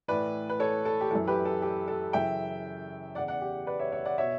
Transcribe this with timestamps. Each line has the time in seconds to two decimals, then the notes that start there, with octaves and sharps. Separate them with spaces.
0.08 A2 E3 B4 D5
0.49 B4
0.60 A4 C#5
0.85 A4
1.01 G4
1.11 F#2 E3 A4
1.28 G4 B4
1.45 A4
1.62 G4
1.88 A4
2.13 F#2 C#3 E3 E5 G5
3.15 E2 C#3 E3 D5 F#5
3.28 D5 F#5
3.41 G4
3.67 B4 D5
3.79 C#5 E5
3.92 C#5 E5
4.05 D5 F#5
4.18 B2 C#5 E5